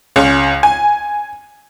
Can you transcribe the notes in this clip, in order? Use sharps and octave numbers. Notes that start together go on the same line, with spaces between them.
C#2 C#4
G#5